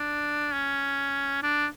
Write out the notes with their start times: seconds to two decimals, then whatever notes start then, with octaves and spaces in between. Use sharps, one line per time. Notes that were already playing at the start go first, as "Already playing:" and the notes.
Already playing: D4
0.54 C#4
1.43 D4